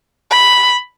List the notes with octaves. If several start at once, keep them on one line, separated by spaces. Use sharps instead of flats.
B5